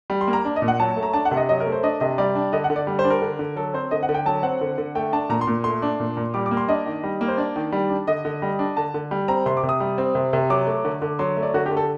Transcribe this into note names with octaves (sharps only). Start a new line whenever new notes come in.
G3
C6
A#3
A#5
D4
D#5
A#2
F#5
F#3 A5
A3
A#5
D4 A5
F#5
C3
D#5
F#3 D#5
A#4
A3
C5
D4 D#5
C3 D#5
G3 D5
D4
D3 D#5
F#5
D3
D5
G3
C5
D4
A#4
D3
D3
F#3 A4
C4 C5
D3 D#5
F#5
D3
G5
F#3 A5
C4 F#5
D3
D3
A3 G5
D4 A5
A#2 A#5
C6
A#2
A3 C6
D4
A#2
A#2
G3 D6
D6
A#3
C6
D4 D#5
D#3
G3
A#3
C5
D4 D5
D#3
G3
D4
D3 D#5
D3
G3
D4
D3 A5
D3
G3
C4 A#5
C3 C6
D6
C3
D#6
G3
C4
C3
C3
F#3 D6
A3
D3
D3
F#3 C6
A3
D5
D3 F#4
G4
D3
A4